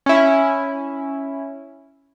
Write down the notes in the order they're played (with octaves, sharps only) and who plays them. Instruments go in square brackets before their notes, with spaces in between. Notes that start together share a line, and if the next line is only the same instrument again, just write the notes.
[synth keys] C#4 E4